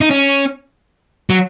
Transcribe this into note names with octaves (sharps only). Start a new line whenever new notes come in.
D#4
C#4
F#3